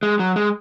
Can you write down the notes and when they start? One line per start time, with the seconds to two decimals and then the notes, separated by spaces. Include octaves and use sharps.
0.03 G#3
0.19 F#3
0.36 G#3